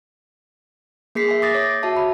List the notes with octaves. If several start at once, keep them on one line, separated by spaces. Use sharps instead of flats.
A#3 G#4 B6 C7
E5 G#5
D6 D#6 A6 A#6
C#5 D6
F#4 E5 A5
B5